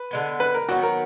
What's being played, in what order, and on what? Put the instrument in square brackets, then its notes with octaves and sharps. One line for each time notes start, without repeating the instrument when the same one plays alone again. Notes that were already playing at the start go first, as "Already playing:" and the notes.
Already playing: [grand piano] B4
[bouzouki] D3 G#3 B3
[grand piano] B4
A#4
[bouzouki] D#3 F#3 B3 [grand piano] F#4
[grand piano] A#4